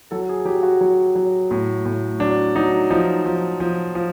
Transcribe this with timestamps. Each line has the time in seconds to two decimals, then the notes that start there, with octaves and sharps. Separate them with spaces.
0.11 F#3 A4
0.29 G#4
0.45 F#3 G4
0.63 F#4
0.81 F#3
1.15 F#3
1.51 A2
1.86 A2
2.20 F#3 D4
2.55 F#3 D#4
2.91 F3 D#4
3.26 F3
3.60 F3
3.95 F3